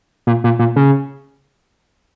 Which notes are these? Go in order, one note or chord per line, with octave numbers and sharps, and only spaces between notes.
A#2
A#2
A#2
C#3